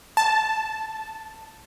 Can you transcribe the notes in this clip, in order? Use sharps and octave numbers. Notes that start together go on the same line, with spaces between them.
A5